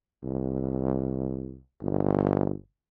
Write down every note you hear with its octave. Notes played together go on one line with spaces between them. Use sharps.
C2
G1